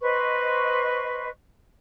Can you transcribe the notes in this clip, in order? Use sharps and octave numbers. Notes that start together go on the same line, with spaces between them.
B4 C5 D#5 C#6